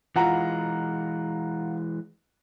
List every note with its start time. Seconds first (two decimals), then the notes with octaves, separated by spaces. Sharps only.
0.16 E3 G#3 F4 F#5 A#5